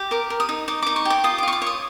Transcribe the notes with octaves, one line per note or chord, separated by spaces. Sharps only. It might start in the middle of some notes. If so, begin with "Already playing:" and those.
Already playing: G4
A#4 D6
A#4
D#6
D#4
D#4 D6
D#4 D6
C#6
G4 D6
F4 D#6
D6
F4 C#6
D6
C#5 D#6